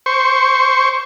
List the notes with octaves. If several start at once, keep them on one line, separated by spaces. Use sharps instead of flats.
C5 C#6